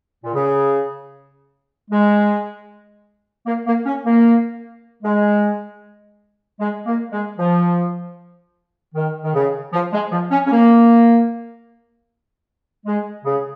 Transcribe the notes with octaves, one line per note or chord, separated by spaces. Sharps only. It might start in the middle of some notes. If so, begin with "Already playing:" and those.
A#2
C#3
G#3
A#3
A#3
C#4
A#3
G#3
G#3
A#3
G#3
F3
D#3
D#3
C#3
F3
G#3
F3
C#4
C#4
A#3
G#3
C#3